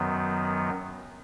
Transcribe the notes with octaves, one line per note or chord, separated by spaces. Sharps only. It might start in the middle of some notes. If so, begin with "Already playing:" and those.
Already playing: F#2 D#3 F#3 B3